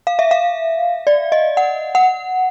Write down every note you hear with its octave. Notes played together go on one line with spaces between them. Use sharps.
F5
E5
F5
D5
D#5
F#5
F#5